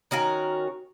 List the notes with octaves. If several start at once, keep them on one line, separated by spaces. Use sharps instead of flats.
D#3 C#4 F#4 A#4